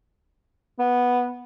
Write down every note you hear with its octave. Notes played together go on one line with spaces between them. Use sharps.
B3